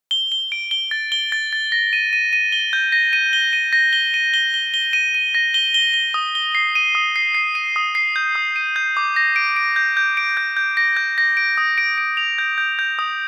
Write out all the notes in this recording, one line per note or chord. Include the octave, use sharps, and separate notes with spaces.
G7
G7
D7
G7
A6
G7
A6
A6
A#6
D#7
D#7
D#7
G7
G6
A#6
D#7
G7
D#7
A#6
G7
D#7
G7
G7
G7
D#7
D#7
A#6
G7
G7
G7
D#6
G7
C7
D#7
D#6
C7
C7
D#7
D#6
C7
G6
D#6
D#7
G6
D6
A#6
D7
D7
G6
G6
D7
G6
G6
A#6
G6
A#6
D7
D#6
D7
D7
F7
G6
G6
G6
D#6